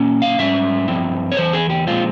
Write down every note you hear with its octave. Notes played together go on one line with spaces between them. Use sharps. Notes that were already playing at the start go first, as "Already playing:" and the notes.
Already playing: A#2 A#3 C#4
F5
G#2 G3 C#4 E5
G2 F3 C4 E4
C#5
E2 E3 C5
G#4
G4
A#2 F3 G#3 C4 F4